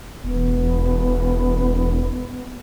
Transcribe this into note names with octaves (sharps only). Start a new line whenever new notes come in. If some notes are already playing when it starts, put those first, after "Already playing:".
E1 B3